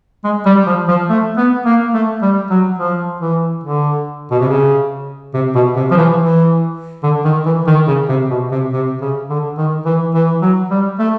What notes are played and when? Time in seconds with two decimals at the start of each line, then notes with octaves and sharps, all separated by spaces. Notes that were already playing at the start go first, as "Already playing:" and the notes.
0.24 G#3
0.46 G3
0.67 F3
0.88 F3
1.10 A3
1.37 B3
1.66 A#3
1.94 A3
2.22 G3
2.51 F#3
2.79 F3
3.21 E3
3.64 D3
4.31 B2
4.40 C3
4.48 C#3
5.34 C3
5.55 B2
5.75 C3
5.91 F3
5.97 E3
6.18 E3
7.03 D3
7.25 D#3
7.46 E3
7.67 D#3
7.88 C#3
8.09 C3
8.30 B2
8.51 C3
8.73 C3
9.01 C#3
9.30 D3
9.58 D#3
9.86 E3
10.14 E3
10.42 F#3
10.71 G3
10.99 A3